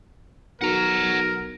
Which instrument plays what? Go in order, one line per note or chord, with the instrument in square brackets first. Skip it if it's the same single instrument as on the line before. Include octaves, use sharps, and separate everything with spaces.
[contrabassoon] B1 [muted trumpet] A#4 [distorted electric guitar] F#5 A#5